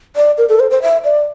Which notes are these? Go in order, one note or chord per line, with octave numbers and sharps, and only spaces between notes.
D5
A#4
A4
C5
C5
E5
D5